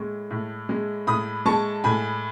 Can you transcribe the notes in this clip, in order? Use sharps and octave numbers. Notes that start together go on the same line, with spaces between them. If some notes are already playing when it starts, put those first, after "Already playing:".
Already playing: A2 G#3 C#6
A2
G#3
A2 B5 D#6
G#3 A5 C#6
A2 G#5 B5